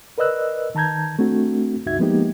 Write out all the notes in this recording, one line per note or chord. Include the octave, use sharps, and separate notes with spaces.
A#4 B4 D5 D#5 E6 F#6
D#3 A5 A#5 G6 G#6
A3 C4 D4 F#4
C#2 G2 D#4 F#4 E5 G#6
F3 G#3 A#3 B3 D#4 G4